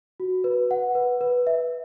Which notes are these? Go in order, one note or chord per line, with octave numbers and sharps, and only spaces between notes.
F#4
B4
F#5
B4
B4
E5